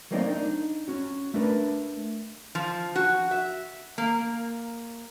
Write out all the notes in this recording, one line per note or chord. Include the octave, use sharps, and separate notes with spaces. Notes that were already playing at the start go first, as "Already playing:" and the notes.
F#3 A3 A#3 C4 D#4 D5
D4 D#4
C#4 F#4
A3 D4 A#4 B4
F3
F#4
E5
A#3